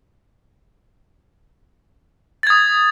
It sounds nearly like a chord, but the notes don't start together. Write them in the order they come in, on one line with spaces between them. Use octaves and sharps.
A6 G#6 D#6